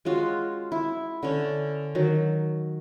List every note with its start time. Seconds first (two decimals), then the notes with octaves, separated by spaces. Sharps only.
0.05 G#3 C#4 F4 F#4
0.72 E4
1.23 D3 C#4
1.95 D#3 F#3